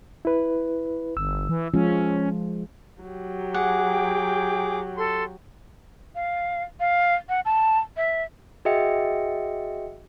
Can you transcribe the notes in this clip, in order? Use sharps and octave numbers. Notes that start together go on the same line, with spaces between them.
E4 B4
G1 E6
E3
F3 G#3 C#4 F4
F#3 G4
G#4 F#5 D6
G5
A4 C6
F5
F5
F#5
A5
E5
F#4 G#4 D#5 E5 G5 C#7